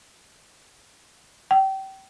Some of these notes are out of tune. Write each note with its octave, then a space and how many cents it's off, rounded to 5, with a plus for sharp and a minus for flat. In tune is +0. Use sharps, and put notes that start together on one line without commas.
G5 -30